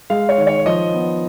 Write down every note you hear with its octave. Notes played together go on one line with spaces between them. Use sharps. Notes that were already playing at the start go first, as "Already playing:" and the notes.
G#3 F5
C#5
D#3
C#5
F3 D#5
B3